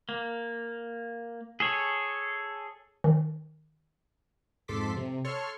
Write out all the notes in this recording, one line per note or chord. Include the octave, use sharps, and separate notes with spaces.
A#3
G#4 A4 C#5
D#3
F2 G#2 A4 C6 D6 B6
C3
A4 C#5 C6 C#6 F6